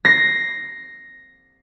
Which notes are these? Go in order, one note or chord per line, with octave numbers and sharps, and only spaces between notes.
A#6 C7